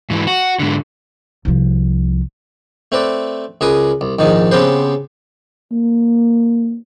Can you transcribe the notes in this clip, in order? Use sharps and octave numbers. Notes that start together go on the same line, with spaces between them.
G#2 E3
F#4
G#2 D3
C2 F3
A3 C4 B4 D5
C#2 G#4 A#4 B4 D#6
C2
A#1 G#2 D#3 D#4
C#3 B3 C4 G4 B4 C5
A#3